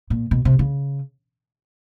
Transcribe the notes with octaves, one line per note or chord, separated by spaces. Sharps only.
A#2
B2
C3
C#3